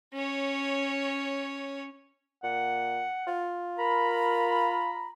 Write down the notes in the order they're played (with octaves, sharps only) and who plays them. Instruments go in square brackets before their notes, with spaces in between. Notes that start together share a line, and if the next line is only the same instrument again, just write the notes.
[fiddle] C#4 C#5
[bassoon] A#2 [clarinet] F#5
[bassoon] F4
[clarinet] A#4 [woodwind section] A#5 B5